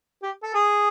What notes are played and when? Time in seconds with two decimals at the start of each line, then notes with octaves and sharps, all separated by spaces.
0.23 G4
0.43 A4
0.54 G#4